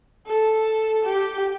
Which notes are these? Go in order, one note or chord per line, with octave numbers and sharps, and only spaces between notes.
A4
G4